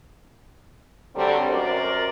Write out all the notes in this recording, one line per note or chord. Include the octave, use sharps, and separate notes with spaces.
D3 F#3 G3 A3 C4
F#2 F#4 A#4 C5 D5